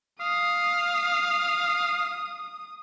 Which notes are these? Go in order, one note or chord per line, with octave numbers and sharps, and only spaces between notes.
F5 D#6